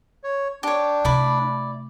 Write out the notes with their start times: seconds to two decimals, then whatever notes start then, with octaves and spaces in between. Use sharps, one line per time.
0.24 C#5
0.63 D4 G4 C#5
1.05 C3 A3 E4 D5 B5